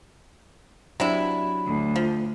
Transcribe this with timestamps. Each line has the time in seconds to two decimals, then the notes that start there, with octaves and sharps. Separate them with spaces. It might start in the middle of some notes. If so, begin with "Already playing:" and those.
1.00 C3 F#3 B3 D4 E4
1.66 D2
1.96 F3